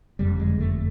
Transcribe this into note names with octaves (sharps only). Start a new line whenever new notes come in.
F#1 F2 D3 G3
G#3
A3